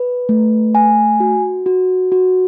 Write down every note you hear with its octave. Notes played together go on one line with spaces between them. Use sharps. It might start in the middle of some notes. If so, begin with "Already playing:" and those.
Already playing: B4
A3
G#5
F#4
F#4
F#4